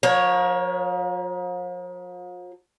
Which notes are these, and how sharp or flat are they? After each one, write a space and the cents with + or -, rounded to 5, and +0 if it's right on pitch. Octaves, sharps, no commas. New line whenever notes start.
F3 +45 A#4 +25 C#5 +0